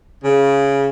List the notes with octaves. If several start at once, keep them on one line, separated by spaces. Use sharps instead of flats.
C#3